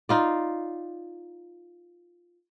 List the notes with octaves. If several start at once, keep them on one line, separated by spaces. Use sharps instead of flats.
D#4 F4 D5